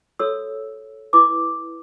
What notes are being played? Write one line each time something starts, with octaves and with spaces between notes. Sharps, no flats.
F#4 A4 C#5 E6
E4 B4 D6